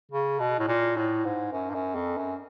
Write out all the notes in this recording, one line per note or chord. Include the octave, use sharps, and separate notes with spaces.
C#3
B2
A2
A#2
A2
G#2
F#2
G2
F#2
F2
F#2